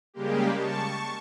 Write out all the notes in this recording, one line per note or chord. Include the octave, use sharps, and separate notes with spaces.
C#3 G3 G#3 A#3 G4
A5 C#6